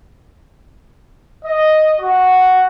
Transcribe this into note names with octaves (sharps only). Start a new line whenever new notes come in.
D#5
F#4